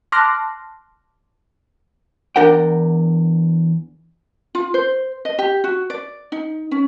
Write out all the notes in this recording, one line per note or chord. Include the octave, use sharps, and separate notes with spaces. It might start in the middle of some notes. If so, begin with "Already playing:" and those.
A5 C6 D6 F6 F#6 A#6
E2 D4 A#4 F#5 G5
F4
C5
D#5
G4
F#4
D5
D#4
C#4